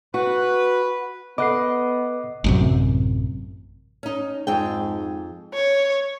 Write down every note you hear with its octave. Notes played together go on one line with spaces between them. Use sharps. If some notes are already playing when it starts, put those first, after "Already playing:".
F#4 B4
B3 A4 D#5 F#5 B5 D6 F#6 C7
A1 F#2 C3
C#4 D#4
F2 G#2 G#4 G5
C#5